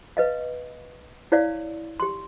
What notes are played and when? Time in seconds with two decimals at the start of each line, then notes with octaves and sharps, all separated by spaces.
0.17 B4 D#5 F5
1.32 E4 C#5 D5 F5
2.00 G4 C6